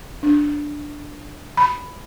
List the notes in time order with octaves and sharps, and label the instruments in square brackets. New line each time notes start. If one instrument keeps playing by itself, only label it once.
[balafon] D4
B5